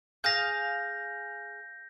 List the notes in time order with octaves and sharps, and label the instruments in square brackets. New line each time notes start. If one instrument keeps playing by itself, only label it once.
[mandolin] G#4 F5 G#5 [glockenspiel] G6 A#6